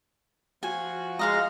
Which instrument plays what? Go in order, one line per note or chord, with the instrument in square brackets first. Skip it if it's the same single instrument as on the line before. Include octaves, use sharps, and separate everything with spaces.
[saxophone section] F3 F4 F#4 [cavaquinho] G#5
[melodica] G#3 A#5 [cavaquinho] D#5 F5 C6